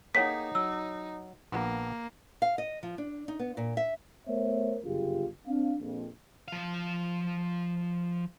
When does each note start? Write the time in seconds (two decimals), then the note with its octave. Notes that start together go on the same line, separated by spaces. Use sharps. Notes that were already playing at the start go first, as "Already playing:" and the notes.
0.15 A#3 D#4 G#4 A4 C#5 F#5 G5 B6
0.55 F#3 E6
1.52 A#1 A#3 B3 F#5
2.42 F5
2.58 D#5
2.83 F3
2.98 D4
3.28 D#4
3.39 B3
3.57 A#2
3.77 E5
4.28 A3 B3 A#4 C5 C#5 E5
4.83 G1 F#2 C#3 F4 G4 G#4
5.47 C4 D4 F5
5.79 A#1 F2
6.48 F3 F5